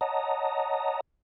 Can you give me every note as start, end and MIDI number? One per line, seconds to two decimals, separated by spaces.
0.01 1.01 73
0.01 1.01 75
0.01 1.01 78
0.01 1.01 81
0.01 1.01 82
0.01 1.01 87